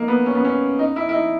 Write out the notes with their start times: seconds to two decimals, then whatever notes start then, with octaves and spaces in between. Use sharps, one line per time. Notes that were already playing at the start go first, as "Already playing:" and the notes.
Already playing: A#3 D#4
0.08 B3
0.26 C#4
0.35 B3
0.45 C#4
0.79 D#4
0.96 E4
1.09 E4
1.14 D#4